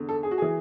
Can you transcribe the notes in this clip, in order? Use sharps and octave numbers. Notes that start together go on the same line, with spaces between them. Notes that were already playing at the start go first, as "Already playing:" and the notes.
Already playing: E2 D3
A4
G#4
F#4
E3 G#4